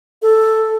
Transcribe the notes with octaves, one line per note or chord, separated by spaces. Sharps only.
A4